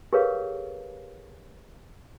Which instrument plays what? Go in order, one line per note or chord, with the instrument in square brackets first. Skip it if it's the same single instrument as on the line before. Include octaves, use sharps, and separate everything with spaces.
[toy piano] G4 G#4 A#4 B4 C#5 F5